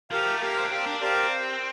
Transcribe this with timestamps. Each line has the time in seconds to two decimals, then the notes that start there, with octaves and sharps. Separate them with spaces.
0.11 F3 G4 A#4 F5
0.27 A3
0.41 A#3 G4 A#4 F5
0.57 C4
0.64 D4
0.71 C4 G4 A#4 D5 F5
0.87 D4
1.02 C4 G4 A#4 D5 F5